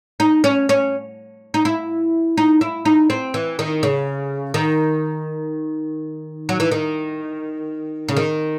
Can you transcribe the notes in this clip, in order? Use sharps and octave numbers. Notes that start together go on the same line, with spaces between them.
D#4
C#4
C#4
D#4
E4
D#4
E4
D#4
C4
E3
D#3
C#3
D#3
F#3
E3
D#3
C#3
D#3